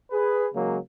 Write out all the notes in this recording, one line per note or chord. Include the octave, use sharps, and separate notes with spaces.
G#4 B4
C#3 F#3 G#3 A#3